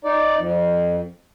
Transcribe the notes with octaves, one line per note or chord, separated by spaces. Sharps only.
D#4 D5
F2